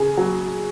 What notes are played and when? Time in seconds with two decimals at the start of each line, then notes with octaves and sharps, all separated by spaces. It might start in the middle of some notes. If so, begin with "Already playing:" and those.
Already playing: C#3 G#4
0.17 F#3